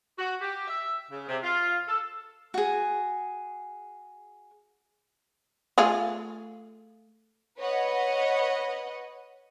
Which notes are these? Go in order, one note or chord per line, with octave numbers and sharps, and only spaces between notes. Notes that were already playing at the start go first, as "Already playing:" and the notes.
F#4
G4
E5
C#3
C3
F4
A4
F#4 G#4
A3 F4 G#4
B4 C#5 D#5 F#5